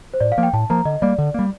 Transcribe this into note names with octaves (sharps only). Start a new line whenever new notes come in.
C5
A2 D5
F5
F3 A#3
G5
A2 A5
F3 A#3 A#5
D3 D#5
G3 A#3 D5
D3
G3 A#3